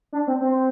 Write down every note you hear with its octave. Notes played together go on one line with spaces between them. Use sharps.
D4
C4
C4